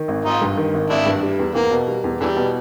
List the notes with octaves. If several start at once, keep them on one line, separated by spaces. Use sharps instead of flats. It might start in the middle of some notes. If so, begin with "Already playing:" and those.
Already playing: D#3
G#1
G#1 D#4 F4
G2
D#3
G#1
G#1 D4 E4
G2
G3
E2
E2 A#3
B2
G3
E2
E2 D3 E3 G3
B2